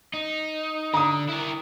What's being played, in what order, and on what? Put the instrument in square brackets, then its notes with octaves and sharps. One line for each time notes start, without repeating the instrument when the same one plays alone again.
[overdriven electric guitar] D#4
[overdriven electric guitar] D3 [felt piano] A#5 D#6
[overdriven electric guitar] E4 A#4